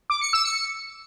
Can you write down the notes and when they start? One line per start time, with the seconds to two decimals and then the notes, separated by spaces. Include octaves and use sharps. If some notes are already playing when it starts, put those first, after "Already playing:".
0.10 D6
0.21 C#7
0.33 E6
0.45 C#7